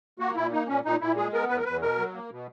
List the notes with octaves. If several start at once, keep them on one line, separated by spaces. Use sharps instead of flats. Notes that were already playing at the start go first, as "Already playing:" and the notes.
A#3 F#4
A#2 E4
A#3 D#4
A#2 C#4
A#2 D#4
A#2 E4
G#3 G#4
B3 A#4
E2 B4
A#4
E2 B4
B2 A#4
F#3
A#3
B2